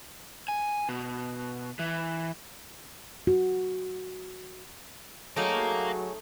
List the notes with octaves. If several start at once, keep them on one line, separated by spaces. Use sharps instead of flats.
G#5
B2
E3
F#4
F#3 A3 D#4 G#4 A#4 C#5 D#5 F5